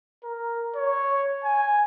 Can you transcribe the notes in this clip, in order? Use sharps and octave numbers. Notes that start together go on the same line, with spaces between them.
A#4
C#5
G#5